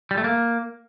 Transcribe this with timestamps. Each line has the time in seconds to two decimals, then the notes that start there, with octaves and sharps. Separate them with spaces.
0.11 G3
0.18 A3
0.24 A#3